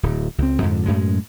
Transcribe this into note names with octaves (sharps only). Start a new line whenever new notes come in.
D1
C#2 C4
F2 G#2 D3
F#2 A2 G#3